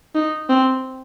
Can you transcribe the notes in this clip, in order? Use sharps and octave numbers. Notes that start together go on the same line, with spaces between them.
D#4
C4